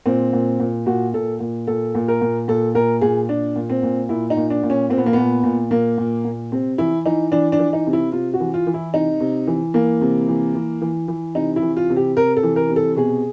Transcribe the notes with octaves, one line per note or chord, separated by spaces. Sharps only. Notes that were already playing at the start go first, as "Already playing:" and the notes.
A#2 C4
A#2
A#2
A#2 F#4
A#2 A4
A#2
A#2 A4
A#2
A#4
A#2
A#2 A4
A#2 A#4
A#2 G#4
A#2 D4
A#2
C4
A#2
A#2 E4
D#4
A#2
D4
A#2
C#4
A#2 C4
B3
A#3
A#2 B3
A#2
A#2 A#3
A#2
A#2
C3 C4
E3 E4
E3 D#4
E3 D4
D4
E3
D#4
C3
E4
C3 F4
F#4
E3
F4
E3
E4
C3 D#4
C3
E3
E3 A#3
C3
E3
E3
E3
E3
C3 D#4
E4
E3
F4
C3
G4
C3 A#4
A4
E3
A#4
C3
A4
B2 G#4